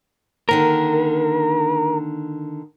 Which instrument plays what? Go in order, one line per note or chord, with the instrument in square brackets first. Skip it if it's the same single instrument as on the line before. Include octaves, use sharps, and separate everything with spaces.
[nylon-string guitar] D3 D#3 A#3 [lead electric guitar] A#4